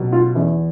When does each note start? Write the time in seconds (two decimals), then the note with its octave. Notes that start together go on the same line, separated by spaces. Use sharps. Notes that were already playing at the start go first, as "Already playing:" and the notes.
Already playing: B2 F#3
0.12 F4
0.35 E2 E4